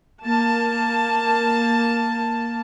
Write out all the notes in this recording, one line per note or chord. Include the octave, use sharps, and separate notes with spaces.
A#3 A5